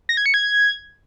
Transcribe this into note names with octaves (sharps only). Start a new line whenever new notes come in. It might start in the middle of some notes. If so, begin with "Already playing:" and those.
A#6
G#6
C#7
G#6